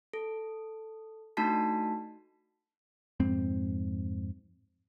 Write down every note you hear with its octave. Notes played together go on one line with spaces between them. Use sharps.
A4
A3 D4 D#4 F#4 A5 B6
F2 G#2 C4